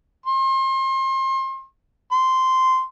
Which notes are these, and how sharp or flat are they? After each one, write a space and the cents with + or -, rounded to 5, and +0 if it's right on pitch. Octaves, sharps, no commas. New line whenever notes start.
C6 +35
C6 -10